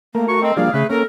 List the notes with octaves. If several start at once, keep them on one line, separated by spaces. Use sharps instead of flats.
A3 A#3 A#4
F#4 C#6
C4 D#5
F3 G3 A#3 D4 G#4 D5 F5
C#3 A3 G#4 B4
A#3 C#4 A4 A#4